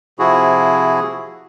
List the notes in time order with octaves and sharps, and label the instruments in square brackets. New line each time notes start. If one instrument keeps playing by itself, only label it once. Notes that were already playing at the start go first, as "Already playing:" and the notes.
[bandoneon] C3 F3 E4 F#4 G#4